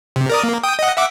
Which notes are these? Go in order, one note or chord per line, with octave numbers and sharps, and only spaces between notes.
C3
A#4 D5 D#6
A#3
G5 D#6
D#5 F#5
E5 F#5 D6